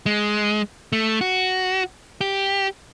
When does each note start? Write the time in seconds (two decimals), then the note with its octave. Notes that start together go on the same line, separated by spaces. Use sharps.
0.06 G#3
0.92 A3
1.21 F#4
2.21 G4